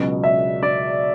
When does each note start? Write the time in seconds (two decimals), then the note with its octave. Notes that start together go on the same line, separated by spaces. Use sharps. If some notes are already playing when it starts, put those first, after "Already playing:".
Already playing: C#2 B2 F#3 B3
0.24 E5
0.63 D5